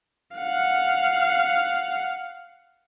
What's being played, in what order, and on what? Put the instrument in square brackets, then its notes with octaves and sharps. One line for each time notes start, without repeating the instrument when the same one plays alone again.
[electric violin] F5 F#5